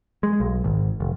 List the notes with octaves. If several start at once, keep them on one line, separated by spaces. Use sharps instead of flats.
G#3
B1
G#1
F1